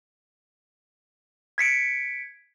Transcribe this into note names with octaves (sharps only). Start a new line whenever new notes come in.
G#6 B6 C#7 D7